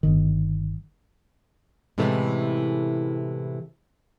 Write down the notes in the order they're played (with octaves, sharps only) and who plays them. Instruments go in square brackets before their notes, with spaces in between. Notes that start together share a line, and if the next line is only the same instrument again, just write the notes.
[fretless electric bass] G1 D#3
[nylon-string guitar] A2 C3 E3 G#3 A3 C#4